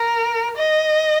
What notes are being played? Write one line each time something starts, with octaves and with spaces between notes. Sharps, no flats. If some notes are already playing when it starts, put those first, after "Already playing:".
Already playing: A#4
D#5